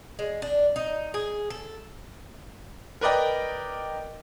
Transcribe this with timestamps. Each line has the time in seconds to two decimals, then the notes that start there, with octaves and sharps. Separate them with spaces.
0.19 G#3
0.42 D4
0.76 D#4
1.14 G#4
1.50 A4
3.01 A#4 B4 D5 D#5 G5